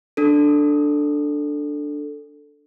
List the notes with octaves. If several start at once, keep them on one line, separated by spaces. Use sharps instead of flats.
D4 A4